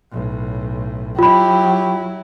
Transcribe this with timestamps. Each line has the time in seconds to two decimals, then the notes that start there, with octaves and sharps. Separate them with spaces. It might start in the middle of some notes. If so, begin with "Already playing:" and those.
0.12 B1 A2
1.19 F#3 E4 F4 G4 B5